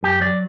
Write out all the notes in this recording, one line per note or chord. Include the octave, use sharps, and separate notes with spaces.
F#2 G4
F#3 D5